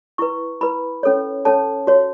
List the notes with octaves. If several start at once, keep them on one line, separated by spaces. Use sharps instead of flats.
E4 B4 C#6
E4 B4 B5
C#4 A4 C#5
C#4 A4 C#5 A5
F#4 C#5